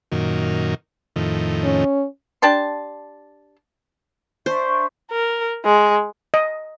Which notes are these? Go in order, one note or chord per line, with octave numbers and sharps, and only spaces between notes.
F#2 A#2 D#3
F2 A2 D#3
C#4
D4 G4 A5 C6
D4 C5 E5 C#6
A#4
G#3
D#5